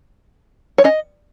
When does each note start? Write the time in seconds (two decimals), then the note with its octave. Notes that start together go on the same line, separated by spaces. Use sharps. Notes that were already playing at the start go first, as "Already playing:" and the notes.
0.78 C#5
0.84 C#4 D#5